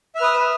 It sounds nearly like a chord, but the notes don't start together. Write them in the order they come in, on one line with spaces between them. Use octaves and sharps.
E5 F6 B4 D#6